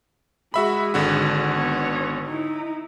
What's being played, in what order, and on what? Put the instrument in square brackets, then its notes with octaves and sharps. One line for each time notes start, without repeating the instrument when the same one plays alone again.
[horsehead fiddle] G#3 G#4 [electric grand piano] F#4 E5 B5
[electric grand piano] G#1 D3 F#4
[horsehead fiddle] B3 C#5
D#4 E4